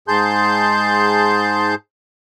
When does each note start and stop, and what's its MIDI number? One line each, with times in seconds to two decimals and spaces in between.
0.08 1.75 44
0.08 1.75 68
0.08 1.75 81
0.08 1.75 84
0.08 1.75 91